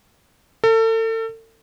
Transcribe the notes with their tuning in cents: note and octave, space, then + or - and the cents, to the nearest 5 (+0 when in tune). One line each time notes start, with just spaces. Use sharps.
A4 +35